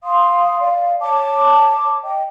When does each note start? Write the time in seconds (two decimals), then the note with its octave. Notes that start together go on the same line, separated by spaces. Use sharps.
0.04 F5 C6 D#6
0.60 D5 F5
1.01 C#5 A5 D6
2.04 D#5 G5